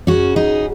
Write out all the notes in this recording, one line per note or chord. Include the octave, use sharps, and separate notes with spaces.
F#2 C#3 C#4 F#4
D#4 G#4